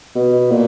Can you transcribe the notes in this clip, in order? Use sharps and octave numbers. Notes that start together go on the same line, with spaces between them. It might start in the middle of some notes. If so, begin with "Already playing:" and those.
B2
A#2